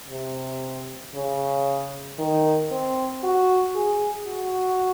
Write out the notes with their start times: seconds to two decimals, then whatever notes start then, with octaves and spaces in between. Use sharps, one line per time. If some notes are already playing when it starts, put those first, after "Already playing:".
0.10 C3
1.14 C#3
2.19 D#3
2.71 C4
3.23 F#4
3.75 G#4
4.27 F#4